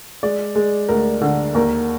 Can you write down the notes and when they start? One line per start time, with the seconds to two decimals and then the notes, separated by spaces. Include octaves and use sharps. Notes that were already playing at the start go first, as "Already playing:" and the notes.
0.23 G#3 D5
0.55 G#3
0.89 D2 A#4
1.22 D3
1.54 D#2 A#4